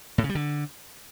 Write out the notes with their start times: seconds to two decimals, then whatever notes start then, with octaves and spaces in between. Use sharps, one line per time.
0.18 A2
0.24 C#3
0.29 G3
0.35 D3